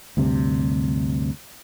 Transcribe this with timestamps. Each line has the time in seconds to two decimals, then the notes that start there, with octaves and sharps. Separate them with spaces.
0.17 D2 G2 C3